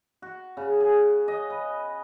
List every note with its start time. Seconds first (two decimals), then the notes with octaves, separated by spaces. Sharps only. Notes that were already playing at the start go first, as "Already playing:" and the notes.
0.22 F#4
0.57 C#3
0.80 G#4
1.28 D#5
1.50 B4